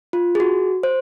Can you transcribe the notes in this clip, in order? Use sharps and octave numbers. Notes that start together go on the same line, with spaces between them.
F4
G#4
F#4
C5